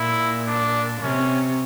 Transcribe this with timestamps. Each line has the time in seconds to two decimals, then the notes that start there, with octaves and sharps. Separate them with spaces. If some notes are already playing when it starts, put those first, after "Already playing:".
Already playing: A#2 E4
0.47 D4
1.02 C3 C#4